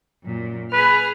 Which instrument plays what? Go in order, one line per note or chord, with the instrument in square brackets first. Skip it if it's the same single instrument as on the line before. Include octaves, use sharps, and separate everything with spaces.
[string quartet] F#2 A#2
[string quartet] G#4 F6 [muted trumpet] B4